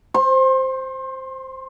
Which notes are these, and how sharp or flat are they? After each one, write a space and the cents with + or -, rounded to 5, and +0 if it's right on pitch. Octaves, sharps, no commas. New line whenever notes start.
C5 +0 C6 +35